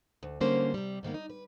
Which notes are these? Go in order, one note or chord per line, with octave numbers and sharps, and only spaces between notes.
D2
G#2 D3 G3 A#3 C#4 C5
C3 G3
G#2 D#3 A#3 B3
D#4
B4